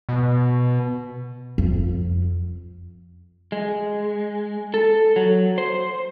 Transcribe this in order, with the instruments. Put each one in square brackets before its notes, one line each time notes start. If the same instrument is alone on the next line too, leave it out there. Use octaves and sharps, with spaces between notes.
[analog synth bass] B2
[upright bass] F2
[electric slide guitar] G#3
A4
F#3
C5